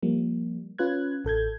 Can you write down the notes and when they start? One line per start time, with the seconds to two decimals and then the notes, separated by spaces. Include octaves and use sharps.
0.03 F3 G3 A#3
0.78 C#4 F4 B4 F#6 G#6
1.25 A1 A4 G6 G#6